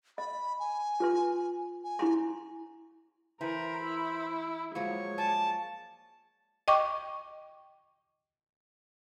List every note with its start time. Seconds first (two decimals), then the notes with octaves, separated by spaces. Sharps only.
0.18 D#5 B5
0.60 G#5
1.00 F4 B4 C6
1.84 G#5
1.99 E4 A#5 C6
3.41 E3 A#4 C5 B5
3.83 E4
4.75 F3 F#3 G#3 A#3 C#5 C#6
5.18 D5 G#5 A5 D6
6.68 D#5 G5 C#6 D6